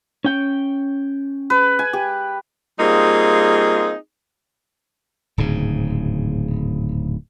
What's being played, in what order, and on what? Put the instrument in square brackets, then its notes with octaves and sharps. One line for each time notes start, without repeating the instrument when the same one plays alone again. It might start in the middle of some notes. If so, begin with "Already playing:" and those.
[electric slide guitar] C#4 G5
[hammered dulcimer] B4
G#5
G4
[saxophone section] G3 A#3 C4 D#4 F4 G#4
[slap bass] D1 G#2 C#3